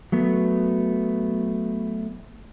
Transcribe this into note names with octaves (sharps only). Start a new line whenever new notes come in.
F#3 A3 B3